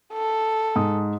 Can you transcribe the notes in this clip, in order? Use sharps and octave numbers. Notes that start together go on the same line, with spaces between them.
A4
G#2 D#6